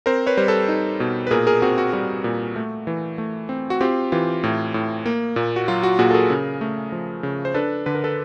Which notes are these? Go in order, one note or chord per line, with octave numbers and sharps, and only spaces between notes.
C4 A#4 C5
B4 C#5
G3 C5
A4 B4
D#4
B2
B4
A#2 G#4 A#4
G#4 A#4
C4 F#4 G#4
F#4
G3 F#4
A#2
A3
E3
A3
C4
F#4
C4 F4 G4
E3 F4 G4
A2
A2
A#3
A#2
F#4
F#3 F4
F#4
A#2 F#4 G#4
A4
G#4 A#4
C#3
A3
F3
C#3
C5
D4 A4 B4
D3 B4
A#4
A4 B4